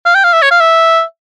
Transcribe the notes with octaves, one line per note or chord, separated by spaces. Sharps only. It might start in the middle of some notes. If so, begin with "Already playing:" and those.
F5
G5
F5
E5
C#5
F5
E5